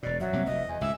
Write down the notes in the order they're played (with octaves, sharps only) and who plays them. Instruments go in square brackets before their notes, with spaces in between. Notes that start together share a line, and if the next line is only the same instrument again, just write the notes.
[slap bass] E1 B2 [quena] D5
[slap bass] F#2 [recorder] F#3 [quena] E5
[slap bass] C2 C3 A#3
[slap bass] F1 [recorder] D#5
[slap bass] E2 [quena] G#5
[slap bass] C#2 G#2 [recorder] E5